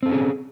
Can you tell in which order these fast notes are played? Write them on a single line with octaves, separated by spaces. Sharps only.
C4 A4 C#4 G#4